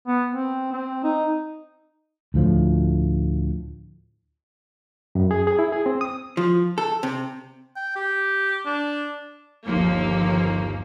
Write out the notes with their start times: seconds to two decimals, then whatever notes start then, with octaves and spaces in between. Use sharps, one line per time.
0.07 B3
0.31 C4
0.72 C4
1.04 D#4
2.34 D2 A2 F3
5.15 F#2
5.31 G#4
5.47 G#4
5.59 E4
5.72 G#4
5.86 C4
6.01 D#6
6.37 F3
6.78 A4
7.03 C3
7.76 G5
7.96 G4
8.66 D4
9.65 G1 D#2 F3 A#3